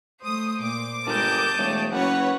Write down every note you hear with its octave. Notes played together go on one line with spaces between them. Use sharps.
A3 C5 D#6
A#2 D6
G1 G#3 A#4 A5 D#6 G6
E1 A3 C#5
F#1 C#4 F#4 B4 C#5 F#5